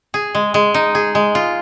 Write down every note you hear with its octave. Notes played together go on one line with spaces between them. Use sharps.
G#4
G#3
G#3
D#4
G#4
G#3
F4